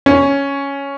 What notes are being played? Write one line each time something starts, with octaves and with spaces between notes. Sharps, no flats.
C#4